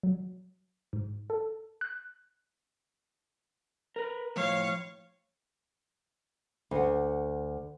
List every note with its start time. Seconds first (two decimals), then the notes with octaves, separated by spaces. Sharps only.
0.03 F#3
0.93 G#2
1.30 A4
1.81 F#6
3.96 A#4 B4
4.36 A2 F3 C#5 F5
6.71 D2 F#5